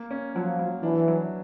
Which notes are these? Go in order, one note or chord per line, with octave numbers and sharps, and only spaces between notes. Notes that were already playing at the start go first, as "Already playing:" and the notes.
Already playing: A#3
C#4
F3 F#3
F#3
E3 D4
F#3